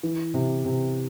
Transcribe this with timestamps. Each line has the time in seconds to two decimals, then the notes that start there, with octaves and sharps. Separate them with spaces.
0.03 E3
0.34 C3
0.65 C3